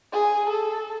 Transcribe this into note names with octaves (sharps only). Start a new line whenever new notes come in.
G#4
A4